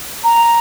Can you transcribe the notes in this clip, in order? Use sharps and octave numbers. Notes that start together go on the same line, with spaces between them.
A#5